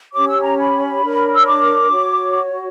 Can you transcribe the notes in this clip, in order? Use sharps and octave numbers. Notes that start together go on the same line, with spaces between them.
C#4 G4 C#5 D6
E6
A#5
B5
D4 A#4 C#5
E6
D6
F#4 C#5